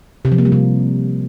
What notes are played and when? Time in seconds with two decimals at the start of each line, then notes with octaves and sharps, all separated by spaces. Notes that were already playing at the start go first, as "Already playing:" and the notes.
0.25 C3
0.32 F3
0.38 A#3
0.45 G3
0.52 C3